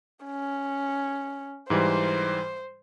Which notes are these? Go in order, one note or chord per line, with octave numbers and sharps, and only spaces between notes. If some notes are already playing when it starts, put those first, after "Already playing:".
C#4
G#2 E3 G3 C5